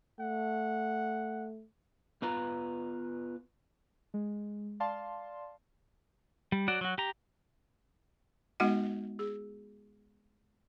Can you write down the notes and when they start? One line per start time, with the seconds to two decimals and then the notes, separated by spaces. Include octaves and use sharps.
0.20 A3 F#5
2.22 B3 F4 B4 A#5
4.14 G#3
4.80 D5 F5 A5 C6
6.52 G3
6.68 F#3 F#4 D5
6.81 F#3 F#4
6.98 G4 A#5
8.60 G#3 B3 D#4 F#4 D#5 F#5
9.19 G#4